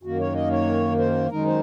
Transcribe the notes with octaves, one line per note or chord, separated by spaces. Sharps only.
F#2 D#3 A#3 F#4
C#5
D#5
C#5
C5
F#2 D#3 G#3 D#4 A#4
C5